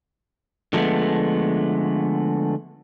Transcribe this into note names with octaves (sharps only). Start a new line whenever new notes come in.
D3 F3 G#3 A3 B3